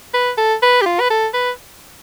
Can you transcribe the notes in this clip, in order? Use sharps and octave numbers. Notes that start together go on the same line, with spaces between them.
B4
A4
B4
G4
F4
B4
A4
B4